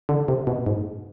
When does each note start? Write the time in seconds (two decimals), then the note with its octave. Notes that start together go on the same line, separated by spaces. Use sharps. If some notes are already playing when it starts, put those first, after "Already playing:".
0.09 D3
0.28 C3
0.47 B2
0.66 G#2